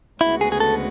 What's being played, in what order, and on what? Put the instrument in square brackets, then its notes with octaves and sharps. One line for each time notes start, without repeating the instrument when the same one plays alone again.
[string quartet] D2 C#3 G#3 B3 F#4 [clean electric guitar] E4
[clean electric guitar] G#4
G#4
A4